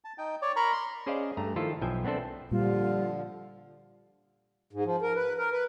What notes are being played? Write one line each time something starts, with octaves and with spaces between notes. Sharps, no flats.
A5
D#4 G5
C#5 D5
A#4 A#5 B5 C#6
C6
C#4 G#4 C5 D5 D#5 F5
G2 A3 A#5
D#3 F3 E4 F4 A4
B1 F3 E5 G5 G#5
B3 C4 D4 A4 C5
A#2 D3 F3 G3 F4
G#2
F3
A#4
B4
A#4
B4